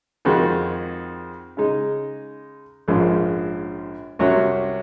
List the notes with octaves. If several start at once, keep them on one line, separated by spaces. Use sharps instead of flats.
F2 D#3 G#3 C4 F#4
C#3 G#3 D#4
A#1 G#2 F3 G#3 C#4
C2 C3 F#3 C#4 F#4